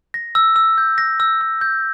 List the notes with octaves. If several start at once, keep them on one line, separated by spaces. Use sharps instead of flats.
A#6
E6
E6
G6
A#6
E6
E6
G6